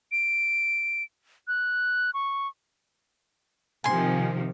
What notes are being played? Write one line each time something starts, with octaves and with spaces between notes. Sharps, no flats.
D7
F#6
C#6
C3 D#3 F3 G#5 C6